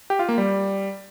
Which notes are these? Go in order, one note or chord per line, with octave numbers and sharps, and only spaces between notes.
G4
F4
A#3
G3